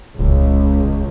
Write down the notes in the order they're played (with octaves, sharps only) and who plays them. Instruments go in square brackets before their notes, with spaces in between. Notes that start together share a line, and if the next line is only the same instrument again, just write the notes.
[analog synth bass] D#1 [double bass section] C#2